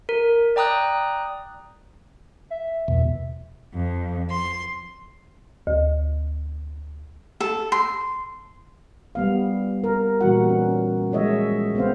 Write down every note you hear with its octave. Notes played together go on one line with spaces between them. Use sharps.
A#4
D5 G5 A#5 D#6 F#6
E5
E2 B2
F2
C6
D2
A4
C6
G3 B3 F5
A#4
A#2 E3 G3 F#4 F#5
C#4
F3 G#3 C#5 D#5 E5
B3 C4 C5 F5